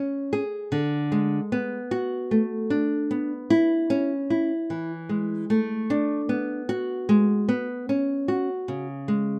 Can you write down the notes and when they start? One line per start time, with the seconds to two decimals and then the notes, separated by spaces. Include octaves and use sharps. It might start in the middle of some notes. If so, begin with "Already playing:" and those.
Already playing: C#4
0.33 G#4
0.72 D3
1.12 G#3
1.52 B3
1.91 F#4
2.31 A3
2.70 D4
3.11 B3
3.50 E4
3.90 C#4
4.30 E4
4.70 E3
5.09 G#3
5.50 A3
5.90 D4
6.29 B3
6.69 F#4
7.09 G#3
7.49 B3
7.89 C#4
8.28 F#4
8.68 C#3
9.08 G#3